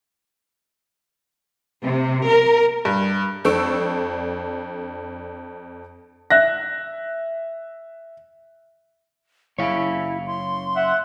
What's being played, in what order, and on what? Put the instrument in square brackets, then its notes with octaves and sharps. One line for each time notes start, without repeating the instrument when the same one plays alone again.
[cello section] C3
A#4
[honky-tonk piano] G2
F2 D4 A4 C#6 E6 D7
[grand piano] E5 F#6 A#6
[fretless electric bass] F#1 [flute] E4 [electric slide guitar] C#5 F5
[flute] C6
[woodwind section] E5 F#5